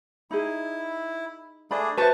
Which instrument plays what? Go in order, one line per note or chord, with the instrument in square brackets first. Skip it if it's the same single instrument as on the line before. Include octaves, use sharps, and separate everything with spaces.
[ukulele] D#4 G#4 [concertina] E4
[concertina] A3 D4 G#4 [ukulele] D5 B5
[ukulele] F#4 C5 E5 [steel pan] B4 A5 [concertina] C#6